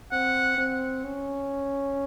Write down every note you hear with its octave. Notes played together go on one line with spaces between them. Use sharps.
C4 F#5
C4
C#4